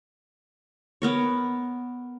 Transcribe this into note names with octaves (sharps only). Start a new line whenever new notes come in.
B3 A#4 C#5